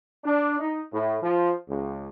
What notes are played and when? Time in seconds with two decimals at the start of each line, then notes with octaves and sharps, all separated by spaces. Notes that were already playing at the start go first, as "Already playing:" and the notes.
0.25 D4
0.60 D#4
0.93 A2
1.22 F3
1.68 C#2